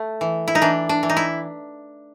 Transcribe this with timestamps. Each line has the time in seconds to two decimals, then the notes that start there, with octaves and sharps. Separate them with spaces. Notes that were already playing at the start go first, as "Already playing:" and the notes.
Already playing: A3
0.21 E3
0.48 E4
0.55 D#4
0.62 E3 D4
0.89 D4
1.03 E3
1.09 D#4
1.17 E4